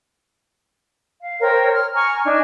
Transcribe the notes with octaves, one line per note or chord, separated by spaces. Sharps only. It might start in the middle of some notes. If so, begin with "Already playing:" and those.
F5
A#4 C5 C#5 G5
F6
G#5 A#5 C#6 F6
D4 D#4 G#5